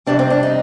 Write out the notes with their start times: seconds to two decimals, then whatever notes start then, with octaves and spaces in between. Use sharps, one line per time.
0.06 F2 C3 G3 D4
0.19 C4
0.30 D4
0.43 D#4